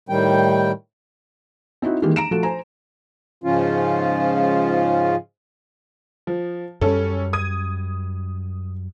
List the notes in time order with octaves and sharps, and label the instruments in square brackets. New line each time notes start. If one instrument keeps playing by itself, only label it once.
[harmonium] A2 D#3 G3 G5
[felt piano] C4 D#4 E4 F#4
D#3 E3 G#3 A#3 G4
A#5 D7 E7
F3 A3 F#4 A4
C5 G#5 A#5
[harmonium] G#2 C#3 F3 C#4 F4
[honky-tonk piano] F3
[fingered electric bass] F#2 G3 [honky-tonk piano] C#4 A4
[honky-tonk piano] D#6 G#6 D#7